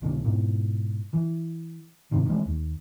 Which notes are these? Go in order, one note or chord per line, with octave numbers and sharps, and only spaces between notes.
B1 B2 D3
G#2 B2
E3
C2 G#2 C3 D#3
E3 G#3 A3
D#2